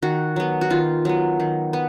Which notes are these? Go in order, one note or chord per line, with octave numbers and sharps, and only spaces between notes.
D#3 F#4
F#3 B3
F#4
D#3 F4
F#3 B3
D#3
B3